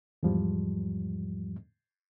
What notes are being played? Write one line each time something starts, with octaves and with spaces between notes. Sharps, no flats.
E2 G#2 F3 G3